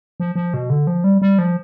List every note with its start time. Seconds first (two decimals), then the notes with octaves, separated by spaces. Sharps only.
0.20 F3
0.36 F3
0.54 B2
0.70 D3
0.87 F3
1.04 G3
1.22 G3
1.39 F3